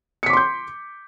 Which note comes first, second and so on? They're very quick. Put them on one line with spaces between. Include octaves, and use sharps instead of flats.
C#7 B6 D6 C6 G6